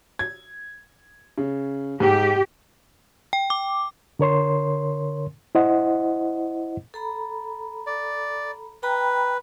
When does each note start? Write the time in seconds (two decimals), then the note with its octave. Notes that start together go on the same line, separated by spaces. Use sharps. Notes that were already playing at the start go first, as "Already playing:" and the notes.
0.19 G#6
1.38 C#3
2.00 G#2 G#3 G4
3.33 G5
3.50 D6
4.19 D3 A#4 C#5 C6
5.55 E4 C5 D#5 F#5
6.94 A4 A#5 B5
7.87 D5
8.83 B4 G5 A#5 B5